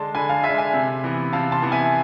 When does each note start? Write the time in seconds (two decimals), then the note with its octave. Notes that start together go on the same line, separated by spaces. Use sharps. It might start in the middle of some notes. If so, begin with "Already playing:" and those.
Already playing: D3 G#3 D4 A5 C6
0.15 D3 G#5 B5
0.29 F5 A5
0.44 G#3 D4 E5 G#5
0.58 E5 G#5
0.74 C3
1.04 E3 B3
1.33 C3 F5 A5
1.52 A5 C6
1.62 E3 B3
1.72 E5 G#5